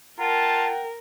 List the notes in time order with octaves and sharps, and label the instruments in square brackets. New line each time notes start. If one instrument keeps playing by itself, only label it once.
[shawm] F4 [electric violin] A#4 [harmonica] F#5 G5 [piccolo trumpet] A5